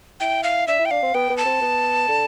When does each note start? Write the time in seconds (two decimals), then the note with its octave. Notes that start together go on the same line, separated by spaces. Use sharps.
0.20 E4 G5
0.44 F5
0.68 D4 E5
0.79 E4
0.85 G5
0.91 D4 F5
1.03 C4
1.14 B3 G5
1.30 B3
1.37 A5
1.46 C4
1.61 B3
2.08 D3